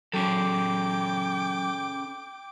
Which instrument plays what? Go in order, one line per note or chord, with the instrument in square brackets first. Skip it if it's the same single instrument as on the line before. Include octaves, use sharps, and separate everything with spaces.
[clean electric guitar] F#3 [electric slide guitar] C#4 G#4 A4 [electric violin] G5 D6